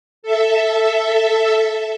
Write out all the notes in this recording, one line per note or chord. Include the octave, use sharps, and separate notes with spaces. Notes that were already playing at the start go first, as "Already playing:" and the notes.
A4 E5